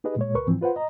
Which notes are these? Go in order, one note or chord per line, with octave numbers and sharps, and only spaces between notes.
D#4 G4 G#4 B4 D#5
A#2 G#3 C#5
C#2 A#4 B4 C#6
G#2 E3 F3 C4
F4 B4 C5 F#5
D#5 A#5